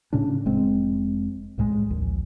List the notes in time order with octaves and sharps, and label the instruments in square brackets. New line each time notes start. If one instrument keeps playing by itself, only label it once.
[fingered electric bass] A2 C#3 C#4 D4
F1 G#3 C4
C2 A2 F3 G#3
A#1 D#2